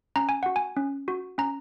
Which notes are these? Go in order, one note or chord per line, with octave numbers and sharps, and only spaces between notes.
C#4 A#5
G#5
F#4 F#5
G#5
C#4
F#4
C#4 A#5